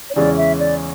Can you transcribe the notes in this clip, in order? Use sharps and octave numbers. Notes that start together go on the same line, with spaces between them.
C#5
E2 C#3 E3 G#3 C#4 D5
E5
D5